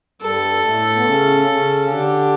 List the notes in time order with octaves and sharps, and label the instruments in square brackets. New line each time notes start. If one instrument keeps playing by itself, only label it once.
[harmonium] G2 G3 [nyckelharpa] A4
[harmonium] A2 A3
B3
C#3 C#4
C#3 C#4
[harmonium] D3 D4 [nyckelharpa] G4